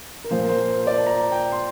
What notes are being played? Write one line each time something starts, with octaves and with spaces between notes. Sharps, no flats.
A#4
A#2 F3 C5
A#4
C5
C5
D5
A5
A#5
G5
C6